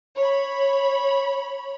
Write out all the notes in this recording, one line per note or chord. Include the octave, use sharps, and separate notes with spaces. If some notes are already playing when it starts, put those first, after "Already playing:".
C#5 B5